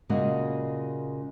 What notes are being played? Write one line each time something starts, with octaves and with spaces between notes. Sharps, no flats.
A#2 C#3 G#3 A#3 F#4